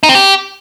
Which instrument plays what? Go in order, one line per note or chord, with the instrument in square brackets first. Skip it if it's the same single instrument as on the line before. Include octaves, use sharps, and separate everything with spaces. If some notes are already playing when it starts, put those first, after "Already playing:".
[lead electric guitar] D#4
C4
G4